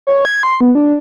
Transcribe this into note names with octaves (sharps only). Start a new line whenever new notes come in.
C#5
G#6
C6
B3
D4